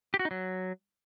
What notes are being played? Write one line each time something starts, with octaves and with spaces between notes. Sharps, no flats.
G4
F#4
D#4
F#3